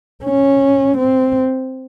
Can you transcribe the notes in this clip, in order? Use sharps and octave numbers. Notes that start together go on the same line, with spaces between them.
C#4
C4